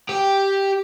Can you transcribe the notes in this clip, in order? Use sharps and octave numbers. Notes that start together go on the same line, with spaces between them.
G4